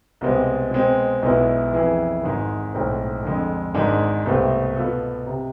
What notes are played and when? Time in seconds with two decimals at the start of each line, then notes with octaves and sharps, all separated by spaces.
0.21 C2 B2 G#3 C4
0.71 B2 G#3 C4
1.23 B1 B2 G#3 B3 E4
1.73 F2 E3 B3 E4 G#4
2.23 G#1 G#2 G#3
2.74 B1 A2 G#3 C4
3.25 F2 D3 G#3
3.74 G#1 G#2 G#3 D4
4.26 C2 B2 A3 C4
4.76 B2 B3 F4 A4
5.27 C3